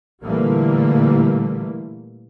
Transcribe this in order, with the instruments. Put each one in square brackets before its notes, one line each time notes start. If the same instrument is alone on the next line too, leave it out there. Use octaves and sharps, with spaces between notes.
[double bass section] A#2 D3 E3 G3 A3 A#3